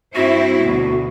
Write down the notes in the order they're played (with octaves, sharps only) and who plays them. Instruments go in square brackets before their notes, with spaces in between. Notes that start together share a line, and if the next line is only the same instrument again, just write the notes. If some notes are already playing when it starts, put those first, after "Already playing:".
[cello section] G2 C4 E4 [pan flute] F#4
[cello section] D2 B2